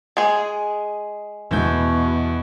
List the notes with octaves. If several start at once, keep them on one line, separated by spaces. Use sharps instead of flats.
G#3 G#4
E2 B2 G6